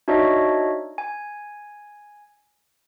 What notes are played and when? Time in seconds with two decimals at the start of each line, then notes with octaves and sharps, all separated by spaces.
0.08 D4 D#4 F#4 C#5 D#5 E5
0.98 G#5